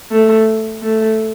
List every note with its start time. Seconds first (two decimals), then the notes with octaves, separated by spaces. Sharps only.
0.11 A3
0.83 A3